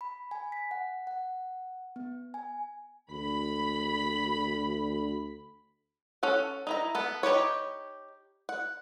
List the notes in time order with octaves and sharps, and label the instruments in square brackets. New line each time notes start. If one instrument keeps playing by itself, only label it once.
[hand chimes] B5
G#5
B6
F#5
F#5
B3
G#5
[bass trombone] D2 [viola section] B5
[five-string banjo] C#4 A4 F#5
D#4 E4 A#5
B3 A4
D#4 G4 B4 C#5
F#5